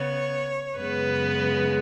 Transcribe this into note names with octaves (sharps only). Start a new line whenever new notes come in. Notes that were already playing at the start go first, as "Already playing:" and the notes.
Already playing: C#3 B3 C#5
F#2 C#3 G#3 B3 B4